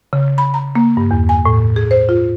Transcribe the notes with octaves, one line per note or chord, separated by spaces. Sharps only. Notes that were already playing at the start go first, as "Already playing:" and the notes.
C#3
B5
A#5
A#3
G2
E2
G#5
A2
G#4
C5
F4